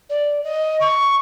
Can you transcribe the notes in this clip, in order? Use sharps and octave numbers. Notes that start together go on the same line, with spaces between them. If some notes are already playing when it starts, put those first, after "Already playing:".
D5
D#5
C#6